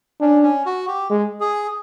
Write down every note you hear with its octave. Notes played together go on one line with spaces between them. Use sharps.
C#4 D4
C#4
F#4
G4
G#3
G#4